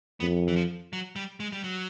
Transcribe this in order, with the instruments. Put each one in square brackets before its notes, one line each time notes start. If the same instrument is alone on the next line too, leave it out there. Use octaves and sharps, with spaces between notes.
[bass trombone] F2 [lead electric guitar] B3
[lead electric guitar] E3
F3
F#3
G3
G#3
G3
F#3